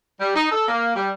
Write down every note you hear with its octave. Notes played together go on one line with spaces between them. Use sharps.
G3
D#4
A4
A#3
G3